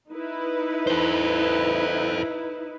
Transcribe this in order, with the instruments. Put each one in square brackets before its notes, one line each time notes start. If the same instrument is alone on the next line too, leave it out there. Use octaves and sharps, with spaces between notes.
[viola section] D#4 E4 B4
[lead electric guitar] A4 C5